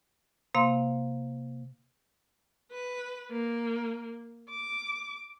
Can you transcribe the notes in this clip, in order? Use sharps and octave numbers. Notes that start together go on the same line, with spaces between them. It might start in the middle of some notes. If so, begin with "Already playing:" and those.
C3 A#3 F5 C6
B4
A#3
D6